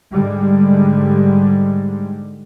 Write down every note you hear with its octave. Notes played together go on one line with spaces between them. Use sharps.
G#2 D3 G3 G#3